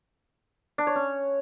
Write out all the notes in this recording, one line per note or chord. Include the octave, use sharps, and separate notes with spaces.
D4
C#5
C#4